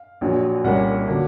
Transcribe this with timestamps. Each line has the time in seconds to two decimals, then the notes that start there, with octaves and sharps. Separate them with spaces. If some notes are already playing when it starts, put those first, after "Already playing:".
Already playing: F5
0.21 A#1 A#2 F#3
0.64 C2 A#2 G3 A#3 C#4 F#5
1.07 D3 F#3 A#3 D4